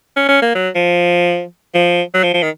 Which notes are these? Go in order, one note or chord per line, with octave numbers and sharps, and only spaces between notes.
C#4
C#4
A#3
F#3
F3
F3
F#3
F3
F3
D#3